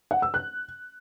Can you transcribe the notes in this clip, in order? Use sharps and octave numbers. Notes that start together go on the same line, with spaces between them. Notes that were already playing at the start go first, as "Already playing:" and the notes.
F#5
E6
F#6